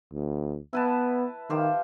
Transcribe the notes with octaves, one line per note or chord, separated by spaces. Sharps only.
D2
B3 E4 B4 A5
D#3 F4 G4 C5